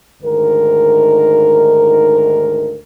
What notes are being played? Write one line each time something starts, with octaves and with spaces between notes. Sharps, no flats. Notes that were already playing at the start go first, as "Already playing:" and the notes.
D2 G#2 D#3 A#4